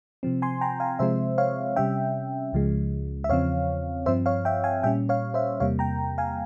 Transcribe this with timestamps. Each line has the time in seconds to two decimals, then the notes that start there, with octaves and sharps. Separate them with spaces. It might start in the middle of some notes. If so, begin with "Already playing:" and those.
0.23 C3 F3 C4
0.42 G#5 C6
0.61 G5 A#5
0.80 F5 G#5
0.99 C3 F3 G#3 C4 C5 E5
1.38 C#5 F5
1.76 C3 G3 C#4 E5 G5
2.53 C#2 C#3 F3 G#3
3.24 E5
3.29 E2 C#3 F3 C4 C#5 F5
4.06 G2 F3 C4 C5 E5
4.26 C#5 F5
4.45 E5 G5
4.64 F5 G#5
4.83 A#2 G3 C#4 E5 G5
5.09 C#5 F5
5.34 C5 E5
5.60 E2 C3 G3 A#3 C#5 F5
5.79 G5 A#5
6.18 F5 G#5